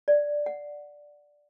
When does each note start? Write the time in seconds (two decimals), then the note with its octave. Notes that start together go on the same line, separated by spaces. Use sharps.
0.08 D5
0.46 F#5